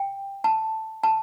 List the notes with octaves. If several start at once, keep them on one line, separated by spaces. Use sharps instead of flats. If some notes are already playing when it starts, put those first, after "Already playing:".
Already playing: G5
A5
A5